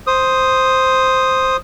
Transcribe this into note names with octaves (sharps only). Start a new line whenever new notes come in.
C5 D#6